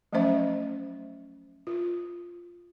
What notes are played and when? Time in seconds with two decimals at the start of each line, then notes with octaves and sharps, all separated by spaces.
0.13 F3 F#3 A3 C#4 C5 E5
1.67 F4